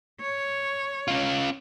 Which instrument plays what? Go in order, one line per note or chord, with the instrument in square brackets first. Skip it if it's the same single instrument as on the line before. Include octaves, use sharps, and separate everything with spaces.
[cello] C#5
[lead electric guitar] C#4 F4